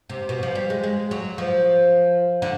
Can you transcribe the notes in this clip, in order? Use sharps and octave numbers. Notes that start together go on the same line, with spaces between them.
C3
B2
F3
G3
G#3
G#3
F#3
F3
D3